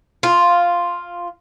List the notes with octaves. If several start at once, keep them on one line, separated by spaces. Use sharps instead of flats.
F4